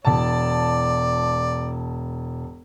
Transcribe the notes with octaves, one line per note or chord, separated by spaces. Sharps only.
E1 D5 A5